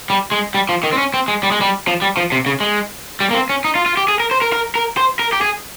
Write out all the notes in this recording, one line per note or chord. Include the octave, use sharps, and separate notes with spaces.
G3
G#3
G3
F3
D#3
C4
C#4
C4
G#3
G3
G#3
G3
F3
G3
F3
C3
C#3
G#3
G3
A#3
C4
C#4
D#4
F4
F4
G4
G#4
A#4
C5
A#4
A#4
A#4
C5
A#4
G4
G#4